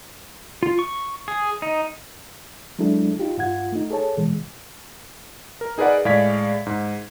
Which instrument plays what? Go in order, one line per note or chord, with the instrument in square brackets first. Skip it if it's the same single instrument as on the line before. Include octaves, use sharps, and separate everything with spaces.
[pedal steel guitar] F4
C#6
G#4
D#4
[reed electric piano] F#3 G#3 D4 E4 A4
D#4 F4 G4
G2 F4 F#5 G#6
A3 D#4
G#4 A4 C#5 A5
B2 E3 G#3
[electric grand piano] A#4
D#4 G#4 A#4 B4 D5 F#5
A2 G#3 D5 F5 G#6 B6
G#2